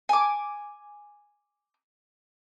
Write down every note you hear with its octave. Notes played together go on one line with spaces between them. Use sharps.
G#5 D6